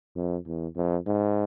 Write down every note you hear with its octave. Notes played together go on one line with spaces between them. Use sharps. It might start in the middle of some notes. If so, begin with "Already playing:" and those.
F2
E2
F2
G#2